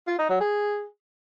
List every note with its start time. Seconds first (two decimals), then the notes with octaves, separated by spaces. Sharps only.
0.07 F4
0.18 D#4
0.29 F#3
0.40 G#4